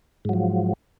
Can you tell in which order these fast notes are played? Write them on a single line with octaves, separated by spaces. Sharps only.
G#2 F#3 F3